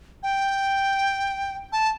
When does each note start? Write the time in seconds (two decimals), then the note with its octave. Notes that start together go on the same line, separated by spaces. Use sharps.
0.23 G5
1.72 A5